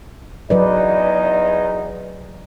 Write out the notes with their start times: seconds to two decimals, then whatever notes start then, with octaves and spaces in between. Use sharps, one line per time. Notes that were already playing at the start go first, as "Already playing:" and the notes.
0.50 E2 F#3 D#4 B4 D5